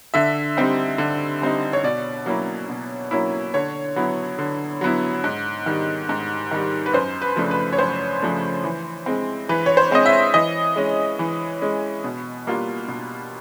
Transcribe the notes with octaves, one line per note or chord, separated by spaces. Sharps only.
D3 E5
G3 C4 D#4
D3
G3 C4 D#4
C#5
B2 D5
F#3 A#3 C#4 E4
B2
F#3 A#3 C#4 E4
D3 C#5
F#3 B3 E4
D3
F#3 B3 E4
G#2
D#3 G3
G#2
D#3 G3
B4
F#2 C5
B4
C#3 F3 A3 D4
B4
C#5
F#2 C5
C#3 F3 A3 D4
E3
G#3 C4
E3 B4
C#5
C5
G#3 C4 D#5
E5
E3 D#5
G#3 C#4
E3
G#3 C#4
B2
G3 A#3 D4 F4
B2